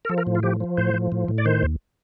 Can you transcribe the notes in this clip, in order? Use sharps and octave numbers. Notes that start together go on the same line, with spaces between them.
A#4
F3 A4
A#4
A2
F4
F3 G4
F3
A2 C5
F3
A2
A2
D5
D#3 C5
D#2